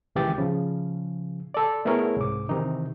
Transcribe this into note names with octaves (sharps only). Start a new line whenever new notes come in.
C#2 D#3 E3 G4 A6
C#3 F3
A4 D5
A3 B3 E4 G#4 A#4 C#5
C2 G#2 D6
C3 D#3 E3 D#4